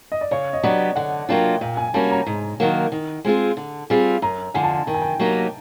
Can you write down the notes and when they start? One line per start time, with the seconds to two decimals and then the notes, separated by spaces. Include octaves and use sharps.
0.12 D#5
0.21 D5
0.31 C#3 C#5
0.53 D#5
0.63 F#3 B3 D4 G4 D5
0.96 D3 F#5
1.29 F#3 A#3 D4 F4 G5
1.61 A#2 G5
1.77 G#5
1.94 G3 A#3 C#4 F#4 A5
2.11 A#5
2.26 G#2
2.60 D#3 F#3 A#3
2.92 D#3
3.25 G#3 C4 F4 G#4
3.57 D3
3.90 G3 C4 F4 G#4
4.22 F#2 A#5
4.54 D3 F3 G#5
4.63 A5
4.71 G#5
4.87 D#3 G5
4.94 G#5
5.02 G5
5.20 F#3 A#3 D#4 G4